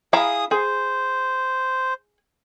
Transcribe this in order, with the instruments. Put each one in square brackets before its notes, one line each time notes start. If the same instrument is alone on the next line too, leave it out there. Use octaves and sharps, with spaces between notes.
[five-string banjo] E4 F5 A#5 [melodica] G#4 D#6
[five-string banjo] G#4 [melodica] C5